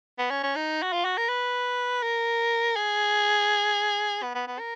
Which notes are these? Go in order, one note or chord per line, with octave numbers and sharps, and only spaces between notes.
B3
C#4
C#4
D#4
F#4
F4
F#4
A#4
B4
A#4
G#4
B3
B3
B3
A#4